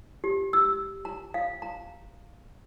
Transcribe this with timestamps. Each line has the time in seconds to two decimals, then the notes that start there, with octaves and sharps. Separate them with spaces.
0.24 G4
0.53 E6
1.05 A#5
1.34 F5
1.62 A#5